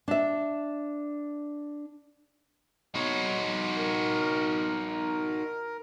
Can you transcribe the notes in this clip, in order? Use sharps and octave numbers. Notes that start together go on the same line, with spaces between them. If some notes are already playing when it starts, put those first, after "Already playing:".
D4 E5
D#4 F#4 C#5
A#4